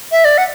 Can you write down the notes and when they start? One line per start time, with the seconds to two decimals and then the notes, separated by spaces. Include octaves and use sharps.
0.12 E5
0.25 D5
0.38 F#5